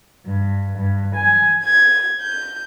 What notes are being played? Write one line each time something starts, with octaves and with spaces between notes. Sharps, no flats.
G2
G2
G#5
G#6
G6